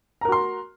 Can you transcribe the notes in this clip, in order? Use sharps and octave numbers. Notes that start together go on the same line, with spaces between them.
F#4 A#4 A#5 C6